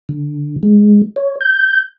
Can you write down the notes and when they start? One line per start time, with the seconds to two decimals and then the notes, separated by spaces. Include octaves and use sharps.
0.09 D3
0.63 G#3
1.16 C#5
1.41 G6